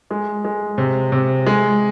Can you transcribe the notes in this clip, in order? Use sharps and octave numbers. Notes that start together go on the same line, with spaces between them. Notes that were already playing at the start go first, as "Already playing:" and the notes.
G#3
G#3
C3
C3
G#3